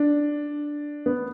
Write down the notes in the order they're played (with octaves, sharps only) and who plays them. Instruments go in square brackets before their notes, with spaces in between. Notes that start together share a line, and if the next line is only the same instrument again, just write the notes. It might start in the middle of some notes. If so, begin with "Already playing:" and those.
Already playing: [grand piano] D4
B3